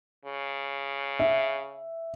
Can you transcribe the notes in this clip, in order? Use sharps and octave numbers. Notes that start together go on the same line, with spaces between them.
C#3
E5